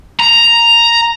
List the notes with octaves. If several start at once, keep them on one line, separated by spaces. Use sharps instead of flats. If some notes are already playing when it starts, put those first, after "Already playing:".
A#5